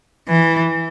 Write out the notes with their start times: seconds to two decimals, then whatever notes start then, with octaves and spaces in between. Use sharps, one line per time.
0.28 E3